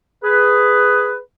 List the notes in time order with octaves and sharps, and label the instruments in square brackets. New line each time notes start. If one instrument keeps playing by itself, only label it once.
[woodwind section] G#4 B4